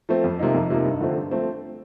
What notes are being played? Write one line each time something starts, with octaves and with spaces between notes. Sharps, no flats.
F3 A3 C4
F2
C3 F3 A#3 D#4
F2
C3 F3 A#3 D#4
G2
D3 F3 A3 C4
G2
F3 A3 C4